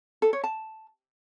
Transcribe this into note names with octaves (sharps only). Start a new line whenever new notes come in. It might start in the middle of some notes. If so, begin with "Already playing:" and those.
A4
C#5
A5